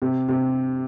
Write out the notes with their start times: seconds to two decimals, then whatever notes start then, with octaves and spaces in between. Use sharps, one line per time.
0.02 C3
0.29 C3